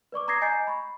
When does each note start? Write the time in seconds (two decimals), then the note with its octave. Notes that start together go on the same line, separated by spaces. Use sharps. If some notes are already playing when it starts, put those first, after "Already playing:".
0.12 B4 D5 C#6 D6
0.28 A#5 D6 D#6 G#6 A#6 C7
0.41 D#5 G#5 A#5 G6 A6 C7
0.67 B5 C#6